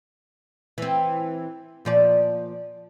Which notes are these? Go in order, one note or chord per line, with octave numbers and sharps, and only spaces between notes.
E3 C4
A#2 F3 D5